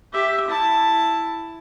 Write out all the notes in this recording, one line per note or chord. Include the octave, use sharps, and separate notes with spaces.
G4 E5
E4 A5